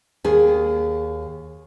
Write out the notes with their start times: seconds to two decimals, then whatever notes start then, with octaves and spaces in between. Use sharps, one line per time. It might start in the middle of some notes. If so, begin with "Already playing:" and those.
0.24 D#2 G#4